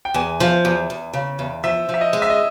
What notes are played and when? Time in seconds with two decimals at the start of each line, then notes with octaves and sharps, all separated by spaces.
0.05 G5
0.14 E2 G#5
0.40 F3
0.65 E2
0.90 E2
1.13 C#3
1.39 E2
1.64 F3 E5
1.89 F3
1.94 E5
2.01 D#5
2.13 G#3
2.22 E5
2.30 D#5